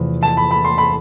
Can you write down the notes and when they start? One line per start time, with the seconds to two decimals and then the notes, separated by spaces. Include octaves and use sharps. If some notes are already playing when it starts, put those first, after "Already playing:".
Already playing: E2 C3 F3 A3 C4
0.23 A5
0.37 B5
0.51 B5
0.65 C6
0.78 B5